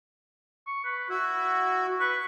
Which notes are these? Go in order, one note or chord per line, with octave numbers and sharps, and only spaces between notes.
C#6
B4
E4 F#4
B4 C#6